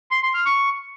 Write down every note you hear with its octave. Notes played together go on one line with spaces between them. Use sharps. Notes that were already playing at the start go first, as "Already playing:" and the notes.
C6
C6
F6
C#6